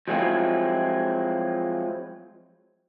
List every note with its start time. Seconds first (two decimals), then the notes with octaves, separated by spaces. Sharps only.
0.08 F3 F#3 G#3 C4 E4 F4